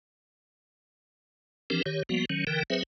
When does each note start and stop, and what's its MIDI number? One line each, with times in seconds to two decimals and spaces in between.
1.70 1.82 52
1.70 1.82 53
1.70 1.82 60
1.70 1.82 62
1.70 1.82 67
1.70 1.82 70
1.86 2.03 51
1.86 2.03 67
1.86 2.03 73
2.09 2.25 53
2.09 2.25 55
2.09 2.25 58
2.09 2.25 59
2.09 2.25 66
2.30 2.44 51
2.30 2.44 54
2.30 2.44 61
2.47 2.63 50
2.47 2.63 52
2.47 2.63 70
2.47 2.63 79
2.70 2.83 54
2.70 2.83 60
2.70 2.83 68
2.70 2.83 71
2.70 2.83 72
2.70 2.83 76